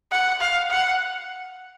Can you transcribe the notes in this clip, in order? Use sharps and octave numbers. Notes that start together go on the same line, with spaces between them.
F#5
F5
F#5